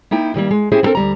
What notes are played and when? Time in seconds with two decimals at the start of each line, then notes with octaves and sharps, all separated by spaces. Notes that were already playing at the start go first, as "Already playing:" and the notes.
0.11 A#3 D#4 E4 G5
0.34 A2 D#3 G3 A#3
0.51 G#3
0.72 C4 C#4 E4 G4 G#4 C5
0.83 B3 C4 D4 A4 A#4
0.95 D2 G3 A#5